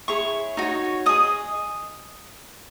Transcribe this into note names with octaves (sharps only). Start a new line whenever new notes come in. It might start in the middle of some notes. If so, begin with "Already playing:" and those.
E4 G#4 C#5 C#6
D#4 F#4 C#5
G#4 D#5 D#6